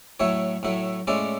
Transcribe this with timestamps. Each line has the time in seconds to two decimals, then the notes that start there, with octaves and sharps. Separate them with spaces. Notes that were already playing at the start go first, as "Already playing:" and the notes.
0.20 A2 F#3 A3 E4 C#5
0.63 A2 F#3 A3 E4
1.07 A2 G#3 C#4 E4 D5